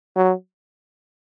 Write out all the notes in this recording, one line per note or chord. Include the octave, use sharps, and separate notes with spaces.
F#3